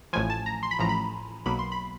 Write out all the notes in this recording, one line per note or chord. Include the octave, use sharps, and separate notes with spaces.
A1 A2 F3 G#5
A5
A#5
C6
B5
A1 A2 F3 A#5
B5
B1 B2 F#3 A#3 B5
C6
B5